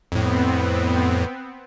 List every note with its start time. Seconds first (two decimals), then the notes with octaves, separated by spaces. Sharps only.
0.12 F2 A2 B3 C4